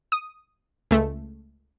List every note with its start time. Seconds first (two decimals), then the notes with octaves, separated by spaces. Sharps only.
0.12 D#6
0.91 C#2 A3